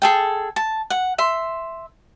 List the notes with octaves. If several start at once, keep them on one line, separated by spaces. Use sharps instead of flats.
G#4 A4 G5
A5
F#5
E5 C6